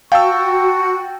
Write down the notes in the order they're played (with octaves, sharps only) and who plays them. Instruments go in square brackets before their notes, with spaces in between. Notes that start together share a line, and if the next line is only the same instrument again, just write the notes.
[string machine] F#4 [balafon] F5 [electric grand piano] G5 A5 E6 [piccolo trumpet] C#6